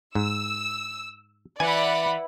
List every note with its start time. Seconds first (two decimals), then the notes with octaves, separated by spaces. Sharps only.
0.15 G#2 E6
1.60 E3 D5 F#5 G#5 B5